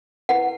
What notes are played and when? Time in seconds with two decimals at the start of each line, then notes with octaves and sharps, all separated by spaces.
0.29 E4 B4 F#5